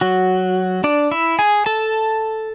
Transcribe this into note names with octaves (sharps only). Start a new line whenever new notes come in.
F#3 F#4
D4 D5
E4 E5
G#4 G#5
A4 A5